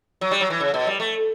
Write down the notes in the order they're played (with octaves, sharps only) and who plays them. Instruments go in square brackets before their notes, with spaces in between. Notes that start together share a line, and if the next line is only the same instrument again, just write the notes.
[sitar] F#3
G3
F#3
E3
C#3
B2
G3
A3